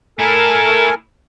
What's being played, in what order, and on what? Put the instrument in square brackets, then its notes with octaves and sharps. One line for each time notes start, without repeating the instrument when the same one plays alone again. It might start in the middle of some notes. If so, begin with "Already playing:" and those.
[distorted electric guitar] A3 E4 [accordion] A4 A#4 G#5